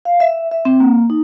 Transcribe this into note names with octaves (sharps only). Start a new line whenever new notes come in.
F5
E5
E5
C4
A#3
D#4